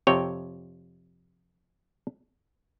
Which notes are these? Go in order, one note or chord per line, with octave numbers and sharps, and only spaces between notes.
F2 C3 C#5 G5